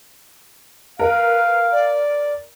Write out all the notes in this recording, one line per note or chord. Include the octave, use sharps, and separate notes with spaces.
A#4 B4 F5
D5